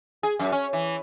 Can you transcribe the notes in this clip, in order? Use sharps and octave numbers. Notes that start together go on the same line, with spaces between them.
G#4
F#2
C#4
E3